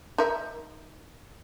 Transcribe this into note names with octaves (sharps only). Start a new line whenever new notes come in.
D#4 A#4 E5